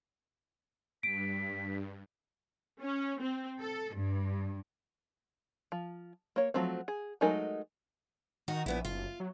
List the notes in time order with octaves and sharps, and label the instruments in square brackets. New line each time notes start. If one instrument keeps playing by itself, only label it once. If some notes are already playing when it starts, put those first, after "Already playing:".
[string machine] G2 [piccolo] B6 [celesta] D7
[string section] C#4
C4
A4
G2
[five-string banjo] F3
A#3 C#5
F3 F#3 A3 C4
G#4
F#3 G#3 A3 D#4 A#4
[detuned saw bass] D#3 [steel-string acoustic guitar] D#4 F#4
[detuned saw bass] A#1 [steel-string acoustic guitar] A#2 B3 E4
[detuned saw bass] F#1 [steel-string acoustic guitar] F4
[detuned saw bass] F#3